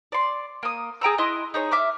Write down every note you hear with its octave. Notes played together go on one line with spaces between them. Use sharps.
D5 C6
A#3 D#6
G#4 G5 A#5 E6
E4 D#5 C6 F#6
D#4 G#4 C#5
E5 D6 F6